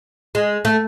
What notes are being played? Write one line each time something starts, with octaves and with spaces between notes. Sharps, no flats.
G#3
A3